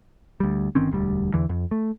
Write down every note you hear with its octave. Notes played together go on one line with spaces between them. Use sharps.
D2 G3
G1 D#3 C4 C#4
E1 D2 G3
E2 D3 E3
F2
A3